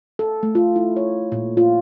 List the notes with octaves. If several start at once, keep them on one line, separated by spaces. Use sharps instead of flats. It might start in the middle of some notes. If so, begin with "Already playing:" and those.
A4
A3
F4
E4
C#5
A#2
F4